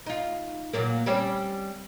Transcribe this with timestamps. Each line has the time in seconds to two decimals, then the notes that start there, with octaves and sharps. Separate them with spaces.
0.06 D#4 F4
0.73 A#2 F#3 A#3
1.06 G3 C4 C#4